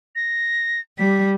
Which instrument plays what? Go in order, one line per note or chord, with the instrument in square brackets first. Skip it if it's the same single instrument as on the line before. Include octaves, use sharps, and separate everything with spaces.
[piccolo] A#6
[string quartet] G3 [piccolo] B6